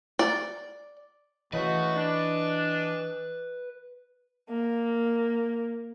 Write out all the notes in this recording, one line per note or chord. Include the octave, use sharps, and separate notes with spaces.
D5
C#3 E3 A3 F#4 B4 D#5
D4
A#3